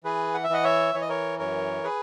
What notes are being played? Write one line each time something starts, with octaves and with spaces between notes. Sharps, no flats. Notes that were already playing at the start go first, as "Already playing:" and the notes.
E3 G#4 B4
F#5
E5
E3 D#5 F#5
C#5 E5
E3 C#5
D#5
A#4 C#5
F#2 A#4 C#5
G#4 B4